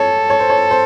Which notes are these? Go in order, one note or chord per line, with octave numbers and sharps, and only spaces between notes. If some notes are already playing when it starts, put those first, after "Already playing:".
Already playing: A4 C#5
C#5
C5
C#5
C5